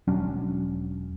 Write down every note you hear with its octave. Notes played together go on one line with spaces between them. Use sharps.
E1 F#3 C#4 D4